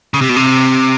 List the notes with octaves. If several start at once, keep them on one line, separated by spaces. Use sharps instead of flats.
C#3
C3
B2
C3